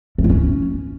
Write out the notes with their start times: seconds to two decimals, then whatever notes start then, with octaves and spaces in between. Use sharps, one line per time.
0.18 A3
0.24 E4
0.30 C#4